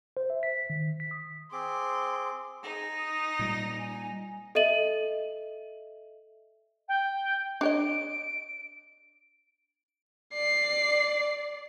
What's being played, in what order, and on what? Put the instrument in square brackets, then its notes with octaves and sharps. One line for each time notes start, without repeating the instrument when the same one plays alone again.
[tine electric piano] C5
E5
B6
D#3
B6
D#6
[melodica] C4 G#4 D6 [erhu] C6
[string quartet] D#4 [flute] G#4
[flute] D#6
[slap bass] A#2 G3
[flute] G#5
[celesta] A4 D#5 E5 D#7 F#7
[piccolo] G5
[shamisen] D4 C#5 D#5 [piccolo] D7
[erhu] D5 [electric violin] C7